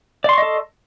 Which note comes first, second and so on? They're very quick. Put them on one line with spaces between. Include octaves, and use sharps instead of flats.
D5 C6 C#6 D#5 A4